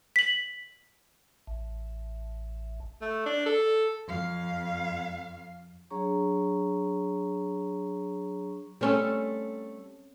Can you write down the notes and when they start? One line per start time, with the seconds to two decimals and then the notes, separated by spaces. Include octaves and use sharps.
0.16 B6 F#7
1.47 A1
3.02 A3
3.26 D4
3.46 A4
4.07 F2 F5
5.90 F#3 D4 G#4 C#5 A#5 C#6
8.81 G3 A3 C4 C#4 A4